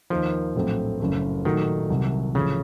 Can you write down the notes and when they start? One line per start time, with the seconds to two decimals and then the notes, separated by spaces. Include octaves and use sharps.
0.10 D#2 D#3 F3 A#3 D#4
0.55 A#1 A2 F#3 A3 C4
1.00 F#1 F#2 C#3 A3
1.45 A#2 D#3 F#3 A3 D#4 F#4
1.90 C2 C3 F#3
2.35 A1 A2 C#3 F3